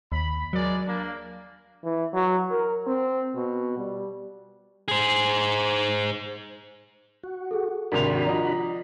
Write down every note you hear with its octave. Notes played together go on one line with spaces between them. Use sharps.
D#2 B5
F#3 G#3 A#4 D5
A#3 D4
E3
F#3
A#4
C4
B2
G3
G#4 C5
F#4
G#4 A4
G#1 D#2 C3 D4 F#4 A#4 B5 F7
F3 D5 D#5 A#5